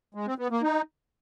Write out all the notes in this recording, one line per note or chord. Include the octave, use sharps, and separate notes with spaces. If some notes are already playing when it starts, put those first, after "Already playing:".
G#3
C4
B3
A#3
D#4